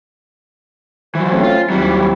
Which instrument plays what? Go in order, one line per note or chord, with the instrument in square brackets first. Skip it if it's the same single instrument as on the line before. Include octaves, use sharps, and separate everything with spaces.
[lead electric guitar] E3 F#3 [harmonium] C5
[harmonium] A3 C4 C#4
[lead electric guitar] F4
[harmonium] D#2 C4 E4 [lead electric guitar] F#3 G3